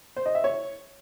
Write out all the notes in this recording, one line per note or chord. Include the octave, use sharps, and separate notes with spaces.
C5
D#5
E5
C#5